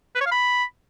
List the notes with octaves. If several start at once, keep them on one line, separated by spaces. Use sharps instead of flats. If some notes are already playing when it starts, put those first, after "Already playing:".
B4
C#5
F5
B5